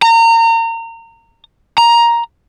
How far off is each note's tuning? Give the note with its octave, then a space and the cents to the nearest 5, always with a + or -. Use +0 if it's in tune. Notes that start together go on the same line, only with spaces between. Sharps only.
A#5 -30
A#5 +10